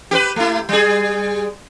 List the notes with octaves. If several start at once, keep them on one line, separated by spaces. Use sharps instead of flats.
G4 A#4 B4
A3 E4
G3 G#4